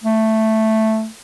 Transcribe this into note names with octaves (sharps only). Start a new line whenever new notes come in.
A3